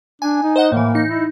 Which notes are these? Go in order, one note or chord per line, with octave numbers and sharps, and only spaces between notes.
D4 G#5
D#4
C5 D#5 F#5
A2 E3 A#3
D#4
E4